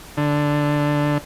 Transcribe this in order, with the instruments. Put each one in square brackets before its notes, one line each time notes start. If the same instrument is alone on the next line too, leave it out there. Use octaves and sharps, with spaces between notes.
[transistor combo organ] D3